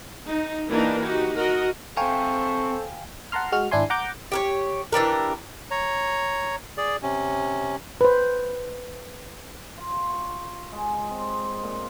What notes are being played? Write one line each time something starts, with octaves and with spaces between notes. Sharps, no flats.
D#4
E3 A#3 D4 D#4 G4 A#4
D#4 F#4 G4
F#4 A#4 D#5
C4 A4 C5 F5 G5 G#5 A#5 C#6
F#5 A5 A#5 C6 F6
G#3 F#4 F#5 F6
G#1 D4 E4 G#5 C6
F#5 A#5 D6 G6
G4 A#4 C#5
E3 D4 G4 A#4
C#5 A#5
G#4 D5
C3 C#4
B4 C5
F4
C#6
G#3
D#4
C4
A#2